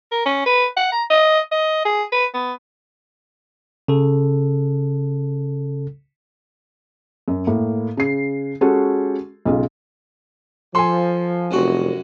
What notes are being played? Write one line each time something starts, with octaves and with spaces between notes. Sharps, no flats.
A#4
C#4
B4
F#5
A#5
D#5
D#5
G#4
B4
B3
C#3 A4
F#2
A2 A#3
C#3 C7
G#3 C#4 F#4 G4 A4
B1 C#3 F4
F3 A4 G#5 C6
F1 C2 F#2 F#4